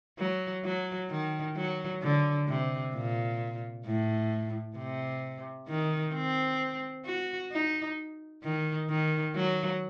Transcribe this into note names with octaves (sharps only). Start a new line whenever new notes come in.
F#3
F#3
D#3
F#3
D3
C3
A#2
A2
C3
D#3
C4
F#4
D#4
D#3
D#3
F#3